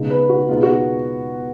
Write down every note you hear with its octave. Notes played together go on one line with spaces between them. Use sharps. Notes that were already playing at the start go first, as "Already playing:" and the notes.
Already playing: C#3 G#3 B3 D#4
B4
F#4
B2 G#3 B3 D#4 F4
F#4